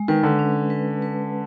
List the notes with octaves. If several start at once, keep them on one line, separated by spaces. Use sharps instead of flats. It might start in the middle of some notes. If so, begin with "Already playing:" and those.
Already playing: G#3
D#3 B4
D3
C#4
B4
B4